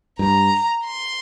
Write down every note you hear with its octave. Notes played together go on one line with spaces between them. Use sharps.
G2 A#5
C6